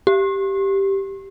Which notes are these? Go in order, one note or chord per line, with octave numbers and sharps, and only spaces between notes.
G4